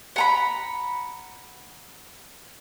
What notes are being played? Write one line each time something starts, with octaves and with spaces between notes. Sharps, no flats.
F#5 A#5 B5